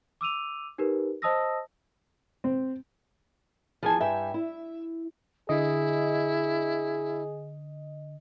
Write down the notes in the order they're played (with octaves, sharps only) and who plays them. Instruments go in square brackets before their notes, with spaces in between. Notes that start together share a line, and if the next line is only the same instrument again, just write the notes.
[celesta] D6 E6 D#7 F7
D#4 G4 A#4 B4
C5 D#5 A5 D#6 E6 A#6
[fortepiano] C4
[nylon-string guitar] E2 G#4 G#5 [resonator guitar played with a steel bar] F3
[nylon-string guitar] G2 G5 G#5 [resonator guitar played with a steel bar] E5
[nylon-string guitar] E4
[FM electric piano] D3 D#5 [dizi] E4 [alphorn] G#4